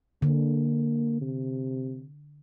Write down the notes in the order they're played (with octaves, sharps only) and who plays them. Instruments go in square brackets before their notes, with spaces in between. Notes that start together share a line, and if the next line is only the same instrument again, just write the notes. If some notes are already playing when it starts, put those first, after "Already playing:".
[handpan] D3 [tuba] A#3
[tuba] C3